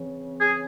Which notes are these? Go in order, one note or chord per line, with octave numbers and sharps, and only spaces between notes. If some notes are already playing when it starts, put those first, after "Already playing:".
Already playing: C#3 E3 C4
G#4